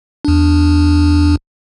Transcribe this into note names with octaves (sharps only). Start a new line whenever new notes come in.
E2 D4